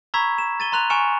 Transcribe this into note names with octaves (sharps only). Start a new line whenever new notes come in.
A#5 B5 C#6 E6 G#6 B6
E7
A6 D#7 G7
A#5 C6 F#6 F7
G#5 C#6 F6 C#7 E7